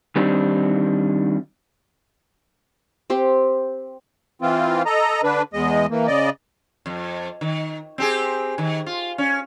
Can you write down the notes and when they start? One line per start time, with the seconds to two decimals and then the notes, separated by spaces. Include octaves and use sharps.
0.16 D#3 G3 C4 D4 D#4
3.10 C4 G4 C5
4.42 E3 C4 F4
4.86 A4 D#5 A#5
5.24 D3 D4 B4
5.53 E2 G#3 D#5
5.90 E3 A#3
6.07 C#3 D5 D#5
6.86 F2
7.41 D#3
7.98 C4 G4 G#4
8.58 D#3
8.86 F4
9.18 C#4